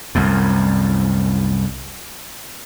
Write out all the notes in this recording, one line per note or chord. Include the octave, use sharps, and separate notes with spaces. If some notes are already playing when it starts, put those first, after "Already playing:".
C2 F#2 A2